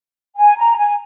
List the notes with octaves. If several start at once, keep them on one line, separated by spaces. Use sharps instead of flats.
G#5
A#5
G#5